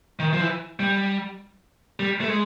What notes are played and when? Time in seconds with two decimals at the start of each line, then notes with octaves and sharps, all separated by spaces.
0.19 D#3
0.33 F3
0.40 E3
0.80 G3
2.00 G3
2.21 A3
2.29 G#3